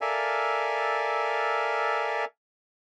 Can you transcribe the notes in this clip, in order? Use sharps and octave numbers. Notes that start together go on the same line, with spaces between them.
A4 A#4 D5 E5 F5 G#5